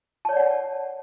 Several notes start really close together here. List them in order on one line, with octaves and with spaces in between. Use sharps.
A5 C#5 D5 F#5